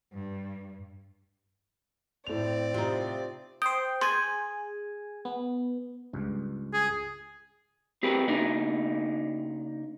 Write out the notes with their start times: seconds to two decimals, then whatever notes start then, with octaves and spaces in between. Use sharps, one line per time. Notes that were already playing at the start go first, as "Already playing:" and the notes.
0.13 G2
2.27 A2 C4 D5 F7
2.74 C3 D#4 F4 G4
3.62 C5 G5 D#6
4.01 G#4 G#5 C6 G6 A6
5.25 B3
6.13 C#2 G2
6.73 G#4
8.03 C4 G4 G#4 A#4 B4
8.28 C#3 A#3 D4 D#4